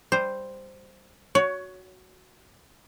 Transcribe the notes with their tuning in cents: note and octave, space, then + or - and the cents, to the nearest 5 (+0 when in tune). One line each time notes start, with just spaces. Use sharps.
G3 +0 C5 +0
F#4 +0 C#5 +20